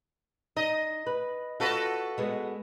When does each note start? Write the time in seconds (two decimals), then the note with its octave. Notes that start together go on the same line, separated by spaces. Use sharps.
0.57 D#4 D#5
1.06 B4
1.60 F4 F#4 A4 B4
2.18 G#3 B3